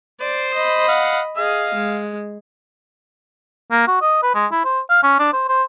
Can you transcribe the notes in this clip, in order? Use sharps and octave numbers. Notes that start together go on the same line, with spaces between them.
C5 D5
D#5 B5
F5 F#5
G#4 D#5 F5
G#3
A#3
F#4
D#5
B4
G#3
E4
C5
F5
C#4
D4
C5
C5